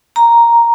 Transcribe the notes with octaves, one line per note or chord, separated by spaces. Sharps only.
A#5